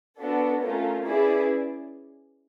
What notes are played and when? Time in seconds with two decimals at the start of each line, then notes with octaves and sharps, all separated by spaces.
0.19 B3 D4 F#4 A4
0.62 A3 C#4 F4 A#4
1.06 C#4 E4 G#4 B4 D5